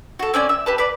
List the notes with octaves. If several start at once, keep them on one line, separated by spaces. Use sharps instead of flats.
F#4 A4
C4 C#4 D5 G#5
E5 E6
G4 B4 A5
B4 D5